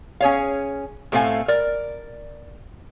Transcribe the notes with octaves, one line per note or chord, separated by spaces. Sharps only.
C#4 G#4 C#5 F5
A2 A3 C4 F4 F5 G#5
A#4 D5